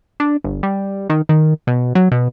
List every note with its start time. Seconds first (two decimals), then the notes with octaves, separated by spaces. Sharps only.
0.20 D4
0.44 G1
0.63 G3
1.10 D#3
1.29 D#3
1.67 B2
1.95 F#3
2.12 B2